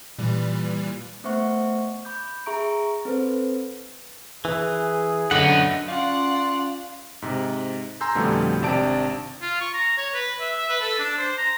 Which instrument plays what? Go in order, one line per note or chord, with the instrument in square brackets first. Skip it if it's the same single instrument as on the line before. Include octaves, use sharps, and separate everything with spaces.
[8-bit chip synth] A#2 E3 G3
[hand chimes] A3 B3 C5 E5 F#5 C#6
B5 D6 G6
G#4 E5 A#5 C#6 D7
C4 A4 B4 C5
[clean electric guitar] E3 [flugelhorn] G#4
[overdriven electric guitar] F#2 B3 [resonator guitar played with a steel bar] D3 F#3 A3 [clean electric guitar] D#5 F#5
[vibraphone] C#4 F4 G#5 [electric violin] D5 F#5 [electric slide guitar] F5 [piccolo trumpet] C6
[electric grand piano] G#2 C3
G#5 A#5 C6 E6 G6
F2 B2 D3 F3 G3 A3
G#1 C3 D4 D5 A5 D7
[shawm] F4
C#6
A#5
C#5
B4
E5
E5
B4
A4
D4
C5
A#5